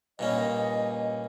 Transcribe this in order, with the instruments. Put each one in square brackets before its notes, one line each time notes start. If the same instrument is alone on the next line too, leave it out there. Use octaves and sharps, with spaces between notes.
[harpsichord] G2 A#2 C#4 [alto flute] D#5